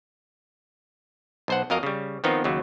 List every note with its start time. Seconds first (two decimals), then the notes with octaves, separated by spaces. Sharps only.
1.48 B1 C5 F#5
1.70 F2 F#3 A#4 D#5 F5 A#5
1.83 C#3 G3
2.24 D#3 F3 B3 C4 D#4
2.44 D#2 C#3 F#3